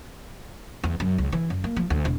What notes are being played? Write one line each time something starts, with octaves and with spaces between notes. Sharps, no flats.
E2
F#2
C#2
E3
F#2
A#3
F3
D2
E1